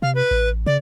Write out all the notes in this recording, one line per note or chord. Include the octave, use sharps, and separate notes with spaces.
C3 F5
B4
A1
C#3 D5